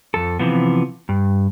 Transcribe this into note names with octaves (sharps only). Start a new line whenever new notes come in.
F2 A4
C3 E3 F3 B3
G2